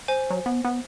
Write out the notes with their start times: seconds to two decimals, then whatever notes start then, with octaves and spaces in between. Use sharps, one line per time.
0.08 C5 G#5
0.30 F#3
0.46 B3
0.64 B3